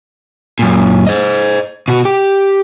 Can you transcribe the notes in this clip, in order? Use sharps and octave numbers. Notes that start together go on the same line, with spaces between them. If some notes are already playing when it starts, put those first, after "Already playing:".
F#2 A#2
C5 D#5
B2 F#4
G4